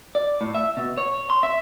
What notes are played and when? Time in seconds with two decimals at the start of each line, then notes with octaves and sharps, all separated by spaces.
0.15 D5
0.41 A2
0.55 E5
0.77 B2
0.98 C#5
1.30 C6
1.43 E5